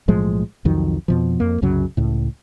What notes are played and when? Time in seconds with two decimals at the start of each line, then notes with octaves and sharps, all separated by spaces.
0.08 B1 A2 F3 G#3
0.65 C2 F2 D#3 F#3
1.08 F2 B2 F3
1.40 F2 A#3
1.62 C2 F#2 C#3 F#3
1.97 C#2 A2